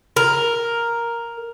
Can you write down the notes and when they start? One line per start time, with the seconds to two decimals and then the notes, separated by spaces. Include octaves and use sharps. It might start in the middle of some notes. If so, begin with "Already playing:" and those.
0.16 A#4